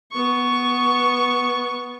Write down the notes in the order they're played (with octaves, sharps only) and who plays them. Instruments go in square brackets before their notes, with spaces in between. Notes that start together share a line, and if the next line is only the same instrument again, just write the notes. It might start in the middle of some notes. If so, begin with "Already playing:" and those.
[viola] B3 C#6